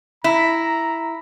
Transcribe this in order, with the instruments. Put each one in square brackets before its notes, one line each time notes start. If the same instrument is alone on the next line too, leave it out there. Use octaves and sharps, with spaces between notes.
[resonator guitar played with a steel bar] E4 [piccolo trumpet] A#5